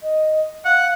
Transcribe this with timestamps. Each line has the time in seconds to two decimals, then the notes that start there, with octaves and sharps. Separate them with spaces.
0.03 D#5
0.65 F5 F#5